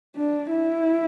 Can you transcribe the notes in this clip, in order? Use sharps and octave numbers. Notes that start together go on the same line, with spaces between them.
D4
E4